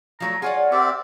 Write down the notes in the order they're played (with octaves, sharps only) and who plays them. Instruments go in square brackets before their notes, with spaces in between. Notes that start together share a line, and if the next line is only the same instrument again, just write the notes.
[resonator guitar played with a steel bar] F3 F#3 A3 [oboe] A#5
[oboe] F4 [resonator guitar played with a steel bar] G#4 C#5 D5 [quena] F#5
[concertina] C4 G4 D5 [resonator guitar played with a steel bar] A#4 [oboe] E5